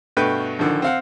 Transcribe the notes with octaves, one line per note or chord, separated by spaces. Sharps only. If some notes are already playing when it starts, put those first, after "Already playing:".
G2 B2 A3 B4 G5 G6
A1 D3 D#3 F3
C4 F5 F#5